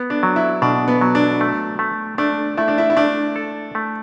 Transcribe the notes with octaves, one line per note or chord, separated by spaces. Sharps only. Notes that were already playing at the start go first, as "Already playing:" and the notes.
Already playing: B3
D4
F#3
E4
B2 D4
B3
F#3
D4
A3
A3
A3 D4
A3 E4
D4
E4
E4
A3 D4
A4
A3